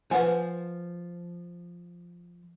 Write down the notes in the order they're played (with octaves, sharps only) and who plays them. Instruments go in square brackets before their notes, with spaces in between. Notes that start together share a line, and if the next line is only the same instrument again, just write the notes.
[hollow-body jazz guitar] F3 [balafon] B4 F#5 G#5